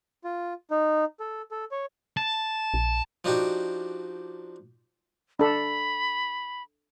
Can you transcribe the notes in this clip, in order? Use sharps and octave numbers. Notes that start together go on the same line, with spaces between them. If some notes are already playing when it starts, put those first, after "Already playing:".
F4
D#4
A4
A4
C#5
A5
A#1
F3 D4 D#4 F#4 G4
D4 A4 B5